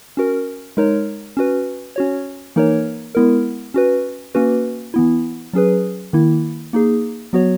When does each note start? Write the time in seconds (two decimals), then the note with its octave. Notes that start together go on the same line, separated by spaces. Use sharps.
0.17 C#4 F#4 A#4
0.77 G#3 D#4 A#4 C#5
1.37 C#4 F#4 B4
1.96 C#4 F#4 C#5
2.56 E3 A#3 D#4 A#4 C#5
3.15 G#3 B3 E4 A#4
3.74 C#4 F#4 B4
4.35 A#3 C#4 F#4 B4
4.94 E3 B3 E4
5.53 F#3 C#4 G#4 B4
6.13 D#3 A#3 E4
6.73 A#3 D#4 G#4
7.33 F#3 B3 F#4 C#5